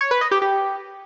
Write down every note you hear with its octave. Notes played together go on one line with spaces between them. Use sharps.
C#5
B4
D#5
G4
G4